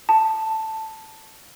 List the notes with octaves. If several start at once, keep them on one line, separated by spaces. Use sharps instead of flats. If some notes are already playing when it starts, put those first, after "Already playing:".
A5